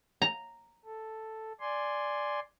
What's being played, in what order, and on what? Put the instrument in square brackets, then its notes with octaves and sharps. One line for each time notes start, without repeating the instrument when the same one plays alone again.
[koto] A#5
[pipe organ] A4
D5 G#5 C6